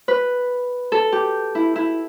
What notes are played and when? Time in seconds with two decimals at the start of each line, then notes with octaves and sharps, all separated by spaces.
0.08 B4
0.92 A4
1.12 G4
1.55 E4
1.76 E4